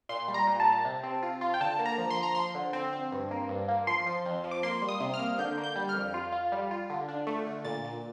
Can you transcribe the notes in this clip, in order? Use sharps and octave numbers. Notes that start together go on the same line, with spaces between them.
A#2 C6
G3
A#5
A#2
A5
A#2
C3
C4
F4
F4
G5
D3 A5
A#3
A#5
F3
C6
F3
A#5
F3 C6
D3
C4
C4
G2
A#3
G2
A#3
F3 C6
F3
F2
F3
D6
A#3 C6
G3
D#6
C3
F6
A#3
D3 G6
A#3
G6
G3
F6
F2
F4
F4
G3
F4
D3
D4
A3
D3
A#2 A6
A#2